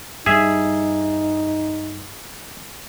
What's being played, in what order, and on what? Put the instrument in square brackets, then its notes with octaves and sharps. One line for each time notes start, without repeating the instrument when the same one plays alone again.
[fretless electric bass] G2 G3 [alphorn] D#4 [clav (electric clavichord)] G#4 E5